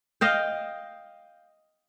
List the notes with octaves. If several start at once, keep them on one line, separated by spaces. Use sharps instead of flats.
D#5 F5 G5